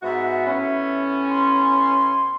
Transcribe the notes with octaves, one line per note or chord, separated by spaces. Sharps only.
G#2 B3 F#4 E5
A2 B3 C#4
C6